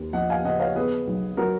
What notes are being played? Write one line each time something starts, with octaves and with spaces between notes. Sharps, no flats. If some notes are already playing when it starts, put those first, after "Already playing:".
Already playing: D#2 A#3
F3 D#5 F#5
F5 G#5
C#3 D#5 F#5
C#5 F5
B3 G#4 B4
B1
F#3 F#4 A#4